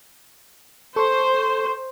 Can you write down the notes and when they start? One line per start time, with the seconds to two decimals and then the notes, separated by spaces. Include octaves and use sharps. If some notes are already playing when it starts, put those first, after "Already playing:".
0.96 A4 C5 C#6